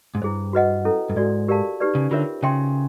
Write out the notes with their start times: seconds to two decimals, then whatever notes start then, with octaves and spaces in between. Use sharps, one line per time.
0.15 G#2
0.22 G2 E4 G#4 C5
0.53 F#4 B4 D#5 F#5
0.85 C#4 E4 A4
1.09 G2
1.16 G#2 F#4 A4 D5
1.48 G4 A#4 D5 F5 A5
1.80 D#4 G4 B4 D5
1.95 C#3
2.11 D3 C#4 F4 A#4 C#5 E5
2.43 C#3 C5 E5 G5 C6